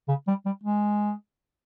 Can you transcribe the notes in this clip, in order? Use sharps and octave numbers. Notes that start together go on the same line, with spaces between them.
C#3
G3
G3
G#3